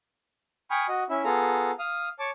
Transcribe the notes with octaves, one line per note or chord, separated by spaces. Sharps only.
G5 G#5 B5 C#6 D#6 F6
F#4 D#5
C#4 E4 E5
B3 F4 G#4 A4 A#5
F5 D#6 F6
C#5 A5 D6